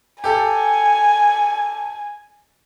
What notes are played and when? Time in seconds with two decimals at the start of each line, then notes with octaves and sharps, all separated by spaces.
0.24 G4 A4 G#5